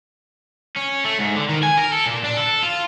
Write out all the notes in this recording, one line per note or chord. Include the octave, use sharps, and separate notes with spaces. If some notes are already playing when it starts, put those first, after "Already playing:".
C#4
A3
G#2
D3
D#3
G#5
A#4
A4
A#2
D4
A4
F4